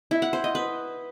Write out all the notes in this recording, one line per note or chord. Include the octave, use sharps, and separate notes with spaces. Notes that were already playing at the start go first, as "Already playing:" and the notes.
E4
F#5
C5
D#5
B4